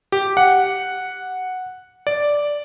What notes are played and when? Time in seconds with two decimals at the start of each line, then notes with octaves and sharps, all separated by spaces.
0.12 G4
0.37 F#5
2.07 D5